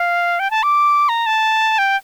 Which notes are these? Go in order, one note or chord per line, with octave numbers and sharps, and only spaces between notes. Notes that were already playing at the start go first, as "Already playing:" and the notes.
Already playing: F5
G5
A5
D6
A#5
A5
G5